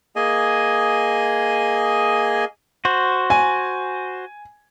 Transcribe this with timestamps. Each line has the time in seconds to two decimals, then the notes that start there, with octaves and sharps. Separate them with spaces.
0.16 A#3 G#4 D#5 G#5
2.85 F#4 C5
3.30 G#5